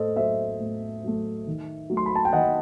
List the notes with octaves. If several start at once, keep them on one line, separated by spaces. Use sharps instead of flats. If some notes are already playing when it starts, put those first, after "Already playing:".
Already playing: A2 A4 C5 D#5
F#3 A3 C5 E5
A2
F#3 A3
D#3
F#3 A3
C6
B5
A5
G5
D#3 D#5 F#5